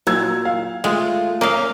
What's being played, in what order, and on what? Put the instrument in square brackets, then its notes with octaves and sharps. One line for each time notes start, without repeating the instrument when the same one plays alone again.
[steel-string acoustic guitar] A#2 [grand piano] F#3 E6 G#6
[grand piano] F5
[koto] G#3 [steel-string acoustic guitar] A3 F4
[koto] A#3 D#5 F5 [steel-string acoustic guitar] C#4